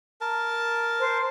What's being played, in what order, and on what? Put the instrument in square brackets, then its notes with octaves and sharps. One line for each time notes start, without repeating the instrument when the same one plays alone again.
[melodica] A#4 A5
[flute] C5